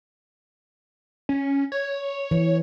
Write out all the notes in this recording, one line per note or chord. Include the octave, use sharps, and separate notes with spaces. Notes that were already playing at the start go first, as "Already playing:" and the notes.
C#4
C#5
E3